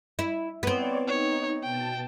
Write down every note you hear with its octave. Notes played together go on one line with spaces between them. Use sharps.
E4
B3 C4 C#5 D5
D#4 C#5
B2 G5 A5